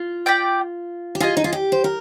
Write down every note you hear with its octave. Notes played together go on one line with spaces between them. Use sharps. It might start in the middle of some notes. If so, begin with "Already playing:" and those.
Already playing: F4
G4 D5 G5
G4
F4 G#4 D#5 G#5
D#4
F4
G4
C5
A#4